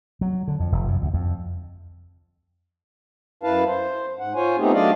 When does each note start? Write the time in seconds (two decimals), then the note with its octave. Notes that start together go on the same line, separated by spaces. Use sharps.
0.21 F#3
0.48 D3
0.60 F2
0.72 F1
0.88 F#2
1.02 D2
1.14 F2
3.43 F#2 E4 B4 F5 A5
3.66 C5
4.19 G#2 F#5
4.35 F4 C5 C#5 G#5
4.58 A3 B3 C4 D#4 G4 G#4
4.73 F#3 A3 D4 D5 D#5 F5